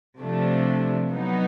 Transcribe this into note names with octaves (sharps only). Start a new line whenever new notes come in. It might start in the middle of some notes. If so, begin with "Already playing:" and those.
C3 F3 A3 D4
F#3 B3 D#4